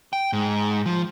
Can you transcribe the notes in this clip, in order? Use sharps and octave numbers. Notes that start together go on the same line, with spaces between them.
G5
G#2
F3